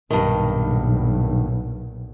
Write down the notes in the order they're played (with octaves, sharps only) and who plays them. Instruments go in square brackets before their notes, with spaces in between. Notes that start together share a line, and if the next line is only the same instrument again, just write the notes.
[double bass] B1 A#2 [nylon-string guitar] G2 D#3